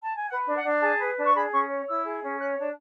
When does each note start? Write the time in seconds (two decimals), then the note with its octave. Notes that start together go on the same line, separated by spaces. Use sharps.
0.03 A5
0.16 G#5
0.29 B4 F#5
0.47 D4
0.55 F#5
0.64 D4
0.82 G#4 A5
1.00 B4
1.17 D4
1.25 C#6
1.34 G#4 B5
1.52 C#4 C#6
1.69 C#5
1.87 E4 E6
2.05 G#4
2.22 C#4
2.39 C#5 F#6
2.57 D4